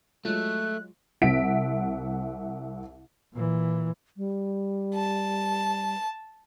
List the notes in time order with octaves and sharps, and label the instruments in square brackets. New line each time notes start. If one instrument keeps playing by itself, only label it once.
[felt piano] F#3 G#3 F4 [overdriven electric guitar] A3 [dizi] F#6
[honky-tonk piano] C2 C4 E5 F#5 B6 D7
[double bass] A#2 E3
[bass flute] G3
[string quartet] A5